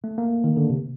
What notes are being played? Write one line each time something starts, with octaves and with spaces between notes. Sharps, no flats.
A3
A#3
D#3
D3
C3